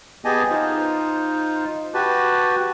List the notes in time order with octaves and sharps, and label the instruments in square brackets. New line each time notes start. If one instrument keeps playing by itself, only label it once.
[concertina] B3 G4 G#4 D#5 G#5 A5
D#4 F4 C5
F#4 G4 B4 A5